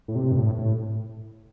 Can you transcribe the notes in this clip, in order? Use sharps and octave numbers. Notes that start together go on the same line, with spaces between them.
A2
C3
G2
A2
A2